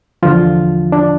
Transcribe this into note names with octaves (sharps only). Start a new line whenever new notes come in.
E2 D3 F3 F4
D4